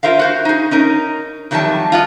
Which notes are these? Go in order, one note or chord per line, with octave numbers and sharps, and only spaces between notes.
F4 A#4 C5 E5 F5
F#4 C5 F5
D#4 G#4
C#4 D#4 A#4
F2 D#3 F#3 G3 E5 A5
F4 F#4 D#5